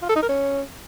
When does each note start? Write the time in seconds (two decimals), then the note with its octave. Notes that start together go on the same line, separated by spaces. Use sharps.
0.02 F4
0.09 A4
0.16 D#4
0.22 A#4
0.29 C#4